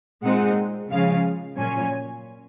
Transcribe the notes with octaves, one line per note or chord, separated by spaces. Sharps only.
A#2 G#3 C4 D#4 F#5
C#3 F3 G#3 C#4 F5
A#2 F#3 C#4 G#5